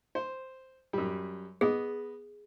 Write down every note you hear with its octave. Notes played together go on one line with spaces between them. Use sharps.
C5
F#2 G3
B3 G#4 D#5